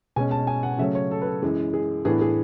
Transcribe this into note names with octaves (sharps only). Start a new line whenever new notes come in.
B2 G#3 C#4 G#5
A5
G#5
F#5
C#3 F#3 A3 C#4 E5
C#5
A4
B4
A4
F#2 E3 G#3
G#4
A2 E3 B3 D4 G#4
G#4